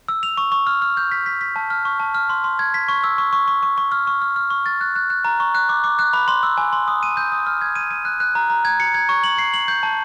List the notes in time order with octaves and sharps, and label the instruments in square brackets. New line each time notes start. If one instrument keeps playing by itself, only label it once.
[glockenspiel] E6
F7
C#6
C#6
F6
F6
G6
B6
B6
B6
A5
F6
C#6
A5
F6
C6
C6
G#6
B6
C#6
E6
C#6
C#6
C#6
C#6
C#6
F6
C#6
F6
F6
C#6
A6
F#6
F#6
F#6
A#5
C#6
F#6
D6
D6
F#6
B5
C6
E6
G#5
C6
D#6
D#7
G6
D#6
F6
G#6
D#7
D#7
F#6
F#6
A#5
A#5
G#6
C#7
G#6
C#6
F#7
C7
F#7
G6
A5